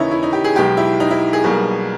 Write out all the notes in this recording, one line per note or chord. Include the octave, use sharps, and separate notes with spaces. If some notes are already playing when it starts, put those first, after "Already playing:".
Already playing: D#2 C#3 E3 C#4 D#4 E4
E4
D#4
G4
G#4
B1 B2 G#3 G4
E4
D#4
E4
G#4
B1 B2 G3 A#3